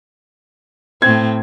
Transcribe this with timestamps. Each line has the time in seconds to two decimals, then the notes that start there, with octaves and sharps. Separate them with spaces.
1.02 A2 C4 G#6